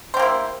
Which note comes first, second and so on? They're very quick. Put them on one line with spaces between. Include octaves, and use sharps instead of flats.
C5 G4 A#3 E4